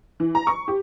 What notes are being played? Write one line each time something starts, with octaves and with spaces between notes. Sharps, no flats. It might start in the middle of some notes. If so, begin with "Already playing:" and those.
E3
A#5
C#6
G4